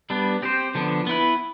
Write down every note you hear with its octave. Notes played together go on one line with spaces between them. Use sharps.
G3 B3 D4
C4 G4 C5
D3 F3 B3 D4
B3 E4 B4